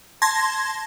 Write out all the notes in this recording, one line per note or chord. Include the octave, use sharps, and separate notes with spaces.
A5 C6 G#6 A#6